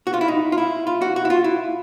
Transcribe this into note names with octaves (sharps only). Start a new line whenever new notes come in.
F#4
F4
E4
D#4
F4
E4
F4
F#4
F#4
E4
F4
E4